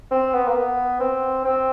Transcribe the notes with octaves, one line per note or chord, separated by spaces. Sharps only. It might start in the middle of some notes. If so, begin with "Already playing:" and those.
C4
B3
A#3
B3
C4
C4